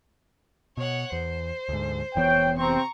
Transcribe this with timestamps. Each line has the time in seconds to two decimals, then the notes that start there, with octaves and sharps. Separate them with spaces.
0.77 B2 C#5 F#5
1.12 E2 C5
1.69 D2 G#2
2.15 F1 E3 B3 C#5 G5
2.58 C3 C4 A#5 C#6